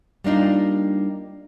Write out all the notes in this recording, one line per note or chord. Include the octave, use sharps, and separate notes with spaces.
G3 A#3 D4 D#4 F4